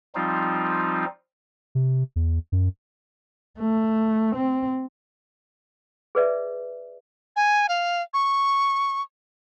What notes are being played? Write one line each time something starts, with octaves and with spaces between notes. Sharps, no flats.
F3 G3 C4 D#4 F4
C3
E2
F#2
A3
C4
G#4 B4 D5 E5
G#5
F5
C#6